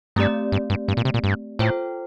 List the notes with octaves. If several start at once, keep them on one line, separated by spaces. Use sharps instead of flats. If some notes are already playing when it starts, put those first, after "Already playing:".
G2 A3 C4 G4 D5
G2
G2
G2
A#2
C3
A#2
G2
A2 F4 A4 C5 G5